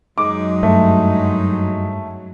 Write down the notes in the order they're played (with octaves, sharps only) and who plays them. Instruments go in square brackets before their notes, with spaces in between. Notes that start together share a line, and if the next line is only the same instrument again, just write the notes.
[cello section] F#2 F#3 [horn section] G#3 D#4 [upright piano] D6
[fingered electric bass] G2 [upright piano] A3